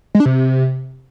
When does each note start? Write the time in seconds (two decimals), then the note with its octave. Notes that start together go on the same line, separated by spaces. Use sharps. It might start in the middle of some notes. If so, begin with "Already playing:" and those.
0.15 G#3
0.20 D4
0.25 C3